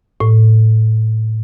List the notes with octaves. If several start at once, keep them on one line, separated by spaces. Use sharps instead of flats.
A2